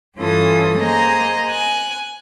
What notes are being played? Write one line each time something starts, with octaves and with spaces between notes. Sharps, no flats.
G2 E3 C#4 F4 A4 D#6
A#3 G#4 C5 D#5 A#5
G#5 F#6